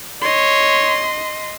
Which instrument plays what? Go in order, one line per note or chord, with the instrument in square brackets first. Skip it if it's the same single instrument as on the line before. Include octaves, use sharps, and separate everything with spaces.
[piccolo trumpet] C#5 [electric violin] D#5 C6